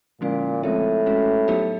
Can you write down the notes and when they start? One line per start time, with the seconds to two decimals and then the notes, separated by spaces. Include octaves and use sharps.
0.21 A#2 D3 F3 G#3 C#4 E4
0.63 A2 F3 G#3 C4 F4
1.06 G#3 C#4 F#4
1.48 F#3 B3 D#4 G4 C5